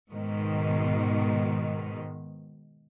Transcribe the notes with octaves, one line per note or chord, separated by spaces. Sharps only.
G#2 B2 D#3